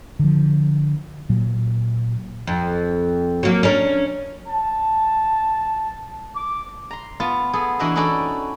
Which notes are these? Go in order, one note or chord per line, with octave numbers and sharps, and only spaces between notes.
D3 F3
A#2 F#3
F2
F#3 A#3
C#4 D4 A#4
A5
D6
A#5 C6
B3 F4 A5
B3 G#4 A4
E3 A#3 D4 F#4 D#5 E5
C#4 D#4 E4 F#4 A4 D5